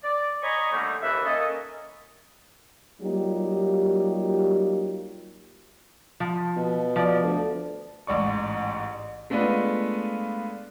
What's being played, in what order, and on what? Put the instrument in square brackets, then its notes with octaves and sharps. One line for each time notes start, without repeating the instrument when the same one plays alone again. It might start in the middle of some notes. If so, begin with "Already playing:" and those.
[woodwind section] D5
C#5 D#5 G#5 A#5 B5 C#6
D3 D#3 G3 A3 A#3 D#4
D#2 C#3 E3 B4 E5
A#3 C#4 A4 D#5
[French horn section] F#3 G3 A#3 D#4 F4 G4
[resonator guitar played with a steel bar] F3
[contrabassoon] B2
[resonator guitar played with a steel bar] F3 D5
[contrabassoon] D2
[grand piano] A1 G#2 D5 C#6
G#3 A3 B3 D4 F4 B4